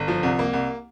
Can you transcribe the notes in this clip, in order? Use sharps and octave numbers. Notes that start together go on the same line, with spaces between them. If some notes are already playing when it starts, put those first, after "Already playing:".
Already playing: G1
F3
C2
A#3
C2